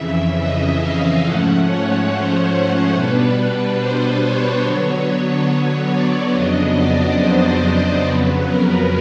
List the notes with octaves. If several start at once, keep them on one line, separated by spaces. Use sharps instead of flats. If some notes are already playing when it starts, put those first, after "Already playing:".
Already playing: F2 C#3 E3 E5
D#5
F5
G#2 F3 A3 C#4 F#5
C#5
C5
B2 G3 B3 D4 B4
C5
C#5
D3 F#3 B3 C#5
D5
F2 C#3 F#3 B3 D4 D#5
D5
C5
F2 C#3 F#3 B3 B4
A#4